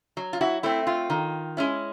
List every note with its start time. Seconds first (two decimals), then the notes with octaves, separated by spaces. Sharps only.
0.17 F#3
0.33 F4
0.41 E4 F#4
0.63 A3 C4 E4
0.87 F4
1.10 D#3
1.57 G#3 C#4 E4